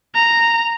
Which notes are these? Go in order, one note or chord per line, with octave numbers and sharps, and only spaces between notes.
A#5